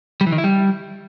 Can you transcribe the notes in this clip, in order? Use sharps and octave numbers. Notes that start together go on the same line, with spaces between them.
G3
E3
D#3
E4
G3